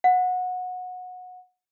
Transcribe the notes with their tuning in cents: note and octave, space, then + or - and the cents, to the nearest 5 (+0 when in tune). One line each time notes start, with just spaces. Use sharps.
F#5 -20